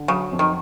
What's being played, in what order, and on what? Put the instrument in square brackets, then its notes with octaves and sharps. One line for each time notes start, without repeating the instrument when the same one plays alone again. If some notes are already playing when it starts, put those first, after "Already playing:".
Already playing: [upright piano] D3
[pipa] C#3 [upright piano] F#3
[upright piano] F2
[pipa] D#3